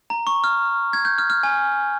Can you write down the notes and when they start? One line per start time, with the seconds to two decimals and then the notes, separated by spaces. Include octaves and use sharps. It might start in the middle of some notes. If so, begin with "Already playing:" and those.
0.10 A#5
0.27 C#6
0.44 F6
0.93 G#6
1.05 G6
1.18 F6
1.30 F6
1.43 G#5